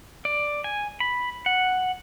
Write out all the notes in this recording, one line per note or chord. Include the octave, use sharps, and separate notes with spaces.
D5
G#5
B5
F#5